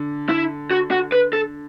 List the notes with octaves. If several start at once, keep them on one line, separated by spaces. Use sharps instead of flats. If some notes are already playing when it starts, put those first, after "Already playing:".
Already playing: D3
E4
F#4
F#4
B4
A4